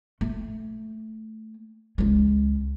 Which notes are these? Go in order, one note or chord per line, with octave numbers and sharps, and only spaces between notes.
A3
C#2 G#3